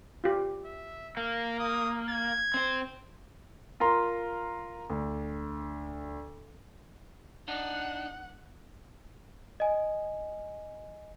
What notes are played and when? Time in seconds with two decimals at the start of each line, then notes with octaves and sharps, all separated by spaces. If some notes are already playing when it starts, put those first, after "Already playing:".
0.24 F4 G4
0.65 E5
1.17 A#3 F5
1.59 D#6
2.10 G#6
2.54 C4 C5
3.80 F4 A#4 A#5 C6
4.90 D2
7.48 D4 D#4 F#5
9.60 D#5 G#5